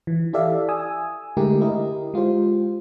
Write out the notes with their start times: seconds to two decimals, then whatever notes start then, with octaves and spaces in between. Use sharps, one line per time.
0.07 E3
0.33 E4 G4 A4 D5 E5 F5
0.69 G#5 D#6 E6
1.37 D3 G#3 A3 E4 G4 A#4
1.61 E4 G4 A#4 D#5
2.14 G#3 F4 G4 C5